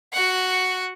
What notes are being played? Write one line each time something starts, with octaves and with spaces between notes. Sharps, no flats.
F#4 F#5